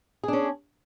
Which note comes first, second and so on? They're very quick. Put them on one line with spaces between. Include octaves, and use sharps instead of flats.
G#4 D4 C#4